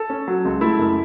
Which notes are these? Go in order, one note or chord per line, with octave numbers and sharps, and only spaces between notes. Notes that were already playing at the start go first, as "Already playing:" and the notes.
Already playing: A4
C#4
F#3
C#2
A3 E4
F#2